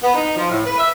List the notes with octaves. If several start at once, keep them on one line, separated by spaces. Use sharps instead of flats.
B3
D#4
F3
A2
B4
E5